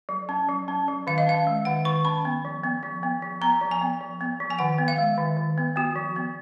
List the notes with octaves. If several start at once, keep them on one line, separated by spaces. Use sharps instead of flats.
F#3
C#4
F#3
C#4
F#3
D#3 F5
D#5
C#4 F5
G#3
D#3 F#5
D#3 C#6
C#4 B5
B3
F3
B3
F3
B3
F3
B3 A#5
F3
G#5
B3
F3
B3
F3
G#5
D#3 F#5
B3
F5
G#3
D#3
D#3
B3
B3 F#4
F3
B3